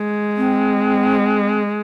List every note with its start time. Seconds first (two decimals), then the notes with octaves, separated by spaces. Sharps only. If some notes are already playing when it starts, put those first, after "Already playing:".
Already playing: G#3
0.37 C4